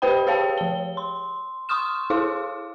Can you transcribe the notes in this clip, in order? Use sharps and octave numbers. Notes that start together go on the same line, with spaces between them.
G4 B4 C5 G5 B5
G4 G#4 C#5 F5 G5 A5
F3 G7
C6
C6 C#6 D#6 F6 E7
E4 G#4 A4 F5 D6